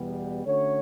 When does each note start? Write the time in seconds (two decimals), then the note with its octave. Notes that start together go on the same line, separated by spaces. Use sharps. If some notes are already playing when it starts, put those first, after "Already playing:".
Already playing: E2 B2 G3 B3
0.44 D3 A3 C#4 F#4 C#5